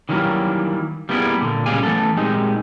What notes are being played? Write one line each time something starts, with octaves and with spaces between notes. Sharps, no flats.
D#3 E3 F#3 G3 A#3
G3 A#3 B3 E4 G#4
A#2 D3
C#2 A#2 G3 G#4 F5 G#5
E3 A3 B3 A4
A#2 G#3 C4 D#4 G4